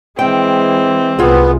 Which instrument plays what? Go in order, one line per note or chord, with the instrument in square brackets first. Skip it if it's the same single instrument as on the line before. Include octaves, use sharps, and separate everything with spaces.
[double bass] E3 G#3 [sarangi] C4 [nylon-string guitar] G5
[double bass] C2 [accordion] B3 [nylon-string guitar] F4 G#4